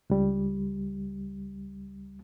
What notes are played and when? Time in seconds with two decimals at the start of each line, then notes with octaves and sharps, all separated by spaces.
0.10 C#2 G3